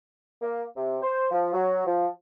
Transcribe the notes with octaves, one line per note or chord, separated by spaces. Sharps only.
A#3
C3
C5
F3
F#3
F3